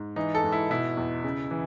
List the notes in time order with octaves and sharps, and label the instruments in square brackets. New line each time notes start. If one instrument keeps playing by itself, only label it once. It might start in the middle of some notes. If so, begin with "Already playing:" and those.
Already playing: [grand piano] G#2
E3 D#4
A4
G#2
E4
B2 E4
E2
C#3
E3